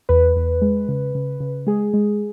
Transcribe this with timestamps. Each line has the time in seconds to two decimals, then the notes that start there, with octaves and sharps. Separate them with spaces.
0.09 E2 B4
0.36 E2
0.62 G#3
0.88 C#3
1.15 C#3
1.40 C#3
1.67 G#3 G#4
1.94 G#3